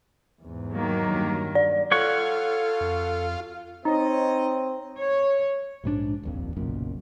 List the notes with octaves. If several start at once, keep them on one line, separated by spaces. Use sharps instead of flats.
E2 G#2
D#3 F#3 A#3
G2
D5
F4 A4 C#5 F#5 C#6
F2
C4 D#4 C#5 D#5
C#5
A#1 G#2 E3 D4
D#1 A#1 F2
F#1 B1 F#2 A#2